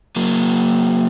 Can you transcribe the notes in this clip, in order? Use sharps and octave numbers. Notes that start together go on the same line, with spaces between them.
F#3 A#3